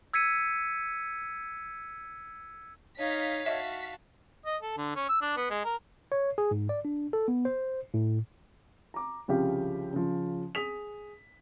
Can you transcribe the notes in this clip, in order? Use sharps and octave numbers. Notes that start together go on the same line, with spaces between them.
E6 G#6 B6 C#7 D#7
D#4 C#5 F5 B6
F#4 D#5 E5 A5
D#5
A4
D3
C#4
E6
D4
B3
G#3
A#4
C#5
G#4
G#2
D5
D4
A4
B3
C5
A2
A#5 D6
C2 C#3 F3 G4 F5
C#3 F3
G#4 D#6 B6 F7